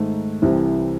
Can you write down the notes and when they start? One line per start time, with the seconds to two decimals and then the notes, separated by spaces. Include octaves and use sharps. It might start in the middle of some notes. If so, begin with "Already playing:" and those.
Already playing: G#2 D#3 A3 D#4
0.42 C2 C3 E3 C4 E4